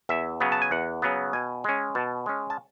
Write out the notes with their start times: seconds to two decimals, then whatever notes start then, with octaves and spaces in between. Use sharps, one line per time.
0.09 E2 E5
0.40 C#3 F#3 B3
0.52 A5
0.62 G#5
0.71 E2 F#5
1.02 C#3 F#3 B3
1.33 B2 G#5
1.64 G#3 C#4
1.95 B2 A5
2.26 G#3 C#4
2.50 A5